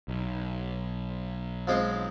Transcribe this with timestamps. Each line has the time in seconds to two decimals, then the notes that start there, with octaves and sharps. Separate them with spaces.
0.08 B1
1.67 F3 G#3 C4